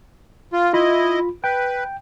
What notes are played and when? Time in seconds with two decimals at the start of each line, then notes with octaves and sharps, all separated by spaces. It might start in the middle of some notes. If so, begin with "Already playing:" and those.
0.53 F4
0.73 E4 F4 D#5 B5
1.44 B4 G5